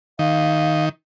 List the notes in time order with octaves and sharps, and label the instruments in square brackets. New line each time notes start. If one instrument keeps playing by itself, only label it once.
[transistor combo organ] D#3 [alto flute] F5